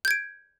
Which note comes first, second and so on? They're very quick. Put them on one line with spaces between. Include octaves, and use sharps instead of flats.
G6 G#6 D7